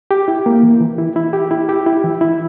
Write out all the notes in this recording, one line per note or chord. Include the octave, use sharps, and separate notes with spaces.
G4
E4
A#3
E3
E3
E4
E4
G4
E4
G4
E4
E3
E4